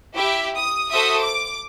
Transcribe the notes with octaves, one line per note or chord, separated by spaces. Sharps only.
E4 G4 E5
D#6
F#4 A4 C5 E5 D#6
D6